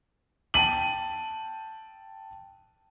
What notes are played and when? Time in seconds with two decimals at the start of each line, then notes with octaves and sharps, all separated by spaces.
0.54 G5 A5 D#7 F#7